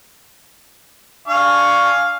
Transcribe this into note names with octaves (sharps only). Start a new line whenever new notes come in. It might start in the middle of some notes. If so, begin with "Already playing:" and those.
D4 F5 G#5 C#6